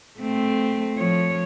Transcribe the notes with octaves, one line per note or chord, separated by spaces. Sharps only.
A3 C4
F3 C#5